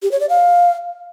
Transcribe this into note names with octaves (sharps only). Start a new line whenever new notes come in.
G4
C#5
D5
F5